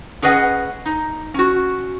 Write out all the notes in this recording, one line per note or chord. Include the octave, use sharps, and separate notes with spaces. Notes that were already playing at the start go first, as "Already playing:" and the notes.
C#4 G#4 B4 D#5 F5 F#5
D#4
C#4 F#4